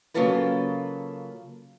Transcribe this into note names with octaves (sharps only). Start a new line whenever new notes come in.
C#3 F#3 A#3 F4 A4 B4